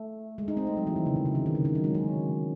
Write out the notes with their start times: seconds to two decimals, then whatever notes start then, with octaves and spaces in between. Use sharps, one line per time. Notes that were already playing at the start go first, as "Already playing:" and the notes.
Already playing: A3
0.38 G#3
0.48 D#4
0.57 C4
0.67 A3
0.77 F#3
0.87 E3
0.96 D#3
1.06 C#3
1.16 C3
1.26 C#3
1.35 D#3
1.46 D#3
1.55 C#3
1.65 D#3
1.75 F#3
1.84 G#3
1.95 C#4